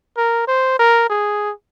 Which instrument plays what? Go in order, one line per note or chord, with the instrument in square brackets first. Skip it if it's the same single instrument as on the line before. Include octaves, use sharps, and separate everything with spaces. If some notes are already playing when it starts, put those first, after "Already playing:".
[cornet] A#4
C5
A#4
G#4